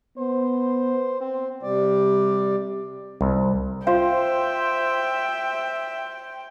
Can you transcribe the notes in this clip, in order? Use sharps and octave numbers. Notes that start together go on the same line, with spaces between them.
B3 C5
C4
C3 G3 D5
C2
F4 C5 E5 F5 G5